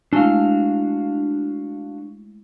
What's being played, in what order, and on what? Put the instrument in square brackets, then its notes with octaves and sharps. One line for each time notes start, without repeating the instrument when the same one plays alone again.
[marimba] G#3 A3 E4 [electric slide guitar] D4 F#4 F5